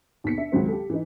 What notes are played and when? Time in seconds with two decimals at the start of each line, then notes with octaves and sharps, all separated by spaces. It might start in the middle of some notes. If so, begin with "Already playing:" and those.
0.24 D#2 B2 B6 C#7
0.37 D4 E5
0.52 C#2 D#3 F#3 C4
0.68 G4 A4
0.90 E3 D#4